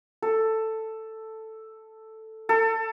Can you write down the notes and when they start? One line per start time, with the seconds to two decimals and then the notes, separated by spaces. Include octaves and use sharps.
0.22 A4
2.49 A4